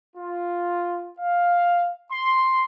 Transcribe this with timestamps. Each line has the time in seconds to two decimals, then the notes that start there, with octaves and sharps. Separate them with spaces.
0.16 F4
1.19 F5
2.12 C6